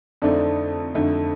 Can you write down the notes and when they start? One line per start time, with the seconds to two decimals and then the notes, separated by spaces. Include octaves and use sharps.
0.22 F2 D3 A3 C4 D#4 D5
0.94 F2 D3 A3 D#4